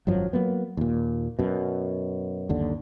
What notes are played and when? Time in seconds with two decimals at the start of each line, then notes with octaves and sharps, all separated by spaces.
0.07 G#1 F#2 F3 F#3
0.33 F#3 A#3 B3
0.77 D#2 A#2
1.39 F#2 B2
2.49 G1 D#2 D3